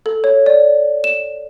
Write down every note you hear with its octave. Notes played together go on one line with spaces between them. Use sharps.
A4
C#5
D5
E7